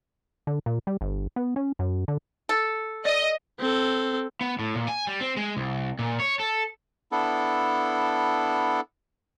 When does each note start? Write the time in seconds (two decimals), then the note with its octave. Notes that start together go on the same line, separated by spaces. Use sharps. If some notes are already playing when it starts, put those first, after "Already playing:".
0.47 D3
0.66 A#2
0.87 G3
1.01 G1
1.36 B3
1.56 C#4
1.79 F#2
2.08 D3
2.49 A4
3.05 D5 D#5
3.60 C4 A4
4.41 B3
4.59 A2
4.75 A#2
4.88 G#5
5.07 G3
5.21 C4
5.37 G#3
5.57 C2
5.99 A#2
6.20 C#5
6.40 A4
7.12 B3 D4 E4 A4